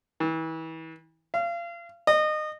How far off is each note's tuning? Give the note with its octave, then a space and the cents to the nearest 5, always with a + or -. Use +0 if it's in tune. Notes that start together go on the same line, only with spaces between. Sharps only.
E3 -35
F5 -30
D#5 -25